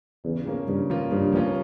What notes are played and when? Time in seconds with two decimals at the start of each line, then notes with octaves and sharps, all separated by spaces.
0.24 E2 C#3
0.46 F3 A#3 C#4 F4
0.67 G2 C#3
0.90 F3 A#3 C#4 F4
1.11 G2 C#3
1.32 F3 A#3 C#4 F4